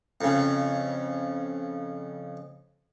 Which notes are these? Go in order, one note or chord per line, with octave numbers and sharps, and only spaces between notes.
F2 C#3